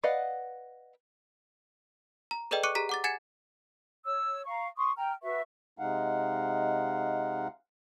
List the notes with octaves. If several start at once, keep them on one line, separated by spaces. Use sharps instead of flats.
B4 D5 D#5 F5 F#5
A#5
G#4 A4 B4 D5 D#5 G5
C#6 D6 F#6 C#7 D#7
G4 G#4 A#5 B6
F#5 D6 A6
F#5 G#5 G#6 A6 C#7 E7
C#5 E6
F5 A#5 C#6
C6 C#6 D#6
G5 A#5 F6
F#4 B4 E5 C#6
C3 G#3 D#4 F5 F#5